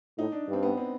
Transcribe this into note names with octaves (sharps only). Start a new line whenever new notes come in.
A2 D#4
D4
G2
C4
B3
C4